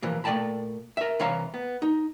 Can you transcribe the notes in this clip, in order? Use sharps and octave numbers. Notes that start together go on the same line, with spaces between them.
A#2 E3 F3 A#3
A#2 A3 D5 G5 A5 B5
A#4 E5
C2 E3 C#5 E5 F5 A#5
B3
D#4